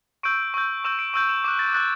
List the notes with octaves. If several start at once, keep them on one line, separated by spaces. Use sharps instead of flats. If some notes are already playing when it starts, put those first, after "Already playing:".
C#6 E6 G6 D7
C#6 E6 G6
C#6 E6 G6 E7
D7
C#6 E6 G6
E7
D6 F#6
A6
D6 F#6 A6